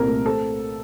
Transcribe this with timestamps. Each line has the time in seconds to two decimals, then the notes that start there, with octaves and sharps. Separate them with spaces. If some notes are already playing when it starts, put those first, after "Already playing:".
Already playing: C2 A#2 C4 A4 A#4
0.08 A3
0.25 C4 A4